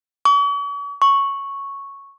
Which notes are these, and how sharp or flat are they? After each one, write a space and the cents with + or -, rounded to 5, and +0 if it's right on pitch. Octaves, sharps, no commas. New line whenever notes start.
C#6 +45
C#6 -5